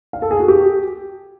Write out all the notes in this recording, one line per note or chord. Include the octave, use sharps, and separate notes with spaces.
F5
A4
G#4
F#4
G4